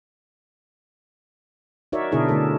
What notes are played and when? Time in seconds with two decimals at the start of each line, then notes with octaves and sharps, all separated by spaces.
1.92 D#4 F#4 A#4 C#5 D5 E5
2.12 B2 D3 D4 E4 G#4 A#4
2.29 D3 A3 A4